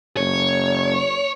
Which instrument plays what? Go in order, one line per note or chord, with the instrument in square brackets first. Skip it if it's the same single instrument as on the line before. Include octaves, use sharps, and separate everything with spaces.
[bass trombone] F#1 [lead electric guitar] C#5